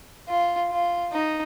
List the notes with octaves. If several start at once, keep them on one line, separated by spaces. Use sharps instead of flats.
F4
F4
D#4